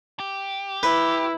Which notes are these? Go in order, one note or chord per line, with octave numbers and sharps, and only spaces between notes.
G4
E4 B4